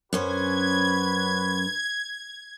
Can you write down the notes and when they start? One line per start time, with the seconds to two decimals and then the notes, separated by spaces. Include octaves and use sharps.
0.13 F#2 C#4 F#4 B4 C5 G#6